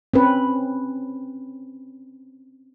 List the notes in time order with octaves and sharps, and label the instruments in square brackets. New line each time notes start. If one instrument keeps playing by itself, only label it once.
[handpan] C4 C#4 B4